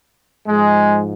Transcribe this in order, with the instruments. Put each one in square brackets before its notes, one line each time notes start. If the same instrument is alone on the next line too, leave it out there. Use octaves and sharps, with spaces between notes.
[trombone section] G#2 F3 G#3